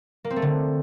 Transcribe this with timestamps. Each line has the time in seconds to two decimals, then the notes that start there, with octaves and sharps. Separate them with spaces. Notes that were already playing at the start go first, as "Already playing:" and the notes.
0.24 A#3
0.30 C4
0.36 A3
0.42 D3